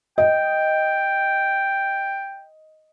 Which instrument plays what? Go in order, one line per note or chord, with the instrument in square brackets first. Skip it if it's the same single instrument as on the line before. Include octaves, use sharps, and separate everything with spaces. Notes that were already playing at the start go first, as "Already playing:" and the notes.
[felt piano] D#5 [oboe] G5